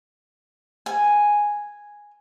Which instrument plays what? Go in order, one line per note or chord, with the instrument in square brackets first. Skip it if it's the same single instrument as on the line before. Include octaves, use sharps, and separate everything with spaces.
[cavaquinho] G#5